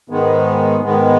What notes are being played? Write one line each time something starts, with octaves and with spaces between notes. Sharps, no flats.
G#2 D#3 G#3 B3
G#2 D#3 G#3 B3